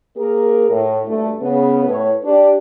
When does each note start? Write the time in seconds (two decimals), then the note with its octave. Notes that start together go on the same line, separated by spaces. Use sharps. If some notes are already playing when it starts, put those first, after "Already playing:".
0.17 A#3 G#4 A#4
0.70 A2
1.06 D2 G2 A3
1.41 C#3 B3
1.87 A2 B4 C#5
2.25 D4 G4